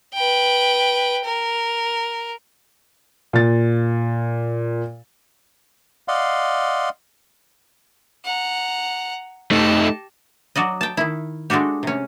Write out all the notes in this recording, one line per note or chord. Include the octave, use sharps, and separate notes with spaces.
B4 G5
A#4
A#2 A6
D5 D#5 F5 F#5 C6
F#5 A#5
A3 D#4 G4 A5
F#3 F#4 D5 D#5
G5 A5
D#3 E4
G#3 A3 D4 F#4 G4
C3 C#4